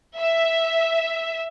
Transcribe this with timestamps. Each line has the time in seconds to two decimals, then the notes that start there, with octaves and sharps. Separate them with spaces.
0.18 E5